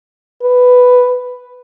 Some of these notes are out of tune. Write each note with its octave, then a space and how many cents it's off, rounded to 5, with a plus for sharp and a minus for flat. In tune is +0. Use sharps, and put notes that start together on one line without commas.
B4 +5